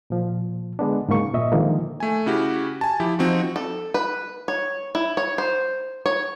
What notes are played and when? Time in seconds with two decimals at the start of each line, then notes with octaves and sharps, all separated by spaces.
0.10 A#2 F3
0.79 D3 G#3 B3 D4
1.09 G#2 C#3 F#3 A#3 C#6
1.34 A#2 D#5 E5
1.52 D3 D#3 F3 G#3 A#3
2.00 A3 G#5
2.26 C#3 E4 F#4 G4
2.81 G#5 A5
3.00 F3 E4 G4
3.19 F3 C4 D#4 F#4
3.56 A4
3.94 B4
4.48 C#5
4.95 E4
5.17 C#5
5.38 C5
6.06 C#5